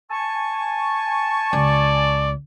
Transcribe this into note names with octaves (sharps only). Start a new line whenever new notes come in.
G#5 A5 C#6
C#2 D5